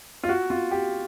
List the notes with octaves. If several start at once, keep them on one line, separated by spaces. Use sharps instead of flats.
F4
F#4
F4
G4